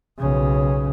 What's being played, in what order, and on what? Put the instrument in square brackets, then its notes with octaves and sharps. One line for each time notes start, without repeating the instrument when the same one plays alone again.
[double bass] B1 C#3